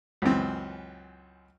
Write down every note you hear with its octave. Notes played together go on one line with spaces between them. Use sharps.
C#2 F#2 E3 C4